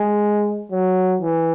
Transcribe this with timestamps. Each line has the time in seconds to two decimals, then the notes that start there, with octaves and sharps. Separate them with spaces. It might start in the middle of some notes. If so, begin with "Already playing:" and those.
Already playing: G#3
0.72 F#3
1.22 E3